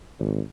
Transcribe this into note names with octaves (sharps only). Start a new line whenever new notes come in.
G#1